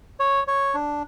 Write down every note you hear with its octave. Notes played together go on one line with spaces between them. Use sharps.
C#5
C#5
D4